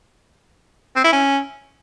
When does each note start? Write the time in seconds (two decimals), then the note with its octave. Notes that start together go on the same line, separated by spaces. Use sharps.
0.96 C4
1.04 E4
1.12 C#4